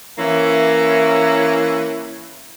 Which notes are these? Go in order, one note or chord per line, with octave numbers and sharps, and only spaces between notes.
E3 A#3 C#4 E4